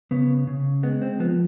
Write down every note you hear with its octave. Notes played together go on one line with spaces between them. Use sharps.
C#3 B3
C#3
G#3 B3
C4
F3 B3